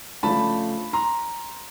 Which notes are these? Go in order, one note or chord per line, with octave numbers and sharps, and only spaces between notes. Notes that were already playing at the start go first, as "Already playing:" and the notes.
C#3 F3 A3 D4 A5 B5
A#5 C6